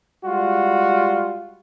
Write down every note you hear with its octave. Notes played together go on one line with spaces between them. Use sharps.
G3 G#3 F4 F#4